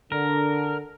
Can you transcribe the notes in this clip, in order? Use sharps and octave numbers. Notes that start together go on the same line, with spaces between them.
D3 A#4